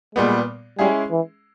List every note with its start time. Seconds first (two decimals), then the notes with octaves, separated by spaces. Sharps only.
0.15 A#2 G3 G#3 B3
0.78 G3 G#3 C#4 E4 G#4
1.11 E3